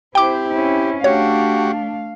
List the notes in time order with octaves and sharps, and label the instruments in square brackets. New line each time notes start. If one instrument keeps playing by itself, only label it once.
[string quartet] C4 [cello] E4 C5 [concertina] G4 [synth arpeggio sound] G5 D6
[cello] C#4 E4
[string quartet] A3 D4 [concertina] F#4 G4 F#5 [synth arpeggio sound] C#5 [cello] F5